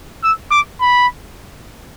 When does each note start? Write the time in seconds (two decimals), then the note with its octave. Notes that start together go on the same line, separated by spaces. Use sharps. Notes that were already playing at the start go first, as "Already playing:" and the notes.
0.23 E6
0.51 D6
0.81 B5